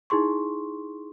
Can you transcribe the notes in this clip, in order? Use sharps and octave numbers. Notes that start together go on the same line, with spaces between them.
D#4 E4 G#4 C6 C#6